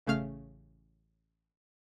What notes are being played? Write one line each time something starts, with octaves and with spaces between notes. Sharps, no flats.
A1 C#3 A3 F5 F6